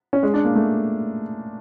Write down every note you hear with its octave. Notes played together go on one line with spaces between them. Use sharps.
C#4
G#3
D4
A#3
A3